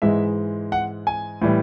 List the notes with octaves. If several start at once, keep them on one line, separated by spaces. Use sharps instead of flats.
G#2 E3 G#3 E5
F#5
G#5
A2 E3 G3